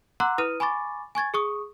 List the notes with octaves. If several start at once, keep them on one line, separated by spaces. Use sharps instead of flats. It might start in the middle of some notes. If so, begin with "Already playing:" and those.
F#5 A#5 C6 D6 E6 F#6
E4 B4 D#6 F6 D#7
G#5 B5 C#6 D6 A6
G#5 C#6 G#6 A6
G#4 C#6 D#6